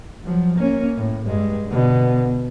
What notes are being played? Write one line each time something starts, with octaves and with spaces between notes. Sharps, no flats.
F3 F#3
A#3 C#4
A2
G2 G#3
B2 D3